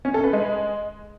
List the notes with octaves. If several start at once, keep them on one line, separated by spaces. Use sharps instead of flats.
C#4
A4
B4
G#3